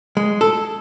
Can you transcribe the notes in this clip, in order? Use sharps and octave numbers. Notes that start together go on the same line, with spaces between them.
G#3
A4